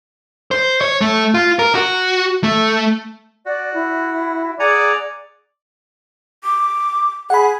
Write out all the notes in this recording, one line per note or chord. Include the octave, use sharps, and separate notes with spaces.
C5
C#5
A3
F4
A#4
F#4
A3
F#4 D5
E4
G#4 D5 F#5 G#5 A#5
D6
G#4 F#5 B5